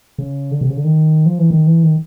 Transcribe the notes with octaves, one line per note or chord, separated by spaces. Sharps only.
C#3
D3
C3
C#3
D3
D#3
F3
E3
D#3
E3
D#3